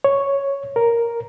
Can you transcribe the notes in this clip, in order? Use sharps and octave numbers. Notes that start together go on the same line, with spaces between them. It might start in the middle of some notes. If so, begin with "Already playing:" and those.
C#5
A#4